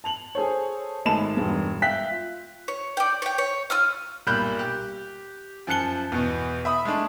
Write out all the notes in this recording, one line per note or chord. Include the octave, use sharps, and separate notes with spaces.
A5 F7 F#7
G#4 A4 C5 C#5
G#1 G#3 A3 A5 B5 E7
E1 G2
E5 F5 G5 F#6 B6
F4
C#5
D5 G5
C#5 G5
C#5
F4 E6 F6
B1 A#2 G3 B5 F#6 G6
G4
F#2 F3 A5 F#6 C#7 G7
E2 B2
E5 B5 D#6
G#3 A3 D4